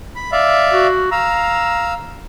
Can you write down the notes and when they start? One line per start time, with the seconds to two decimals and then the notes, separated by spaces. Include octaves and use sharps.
0.15 B5
0.32 D5 E5 F5
0.72 F#4
1.11 F5 A#5 E6